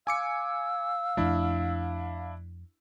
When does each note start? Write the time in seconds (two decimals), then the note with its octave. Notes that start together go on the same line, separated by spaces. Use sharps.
0.07 F5 G#5 D6 E6 C#7
1.17 F2 F3 A3 D4 E4